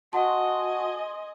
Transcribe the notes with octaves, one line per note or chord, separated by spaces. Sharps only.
F#4 D#5 F#5 G#5 A5 C6